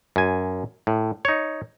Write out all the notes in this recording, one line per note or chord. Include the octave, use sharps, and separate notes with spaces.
F#2 G#5
A2
D#4 C#5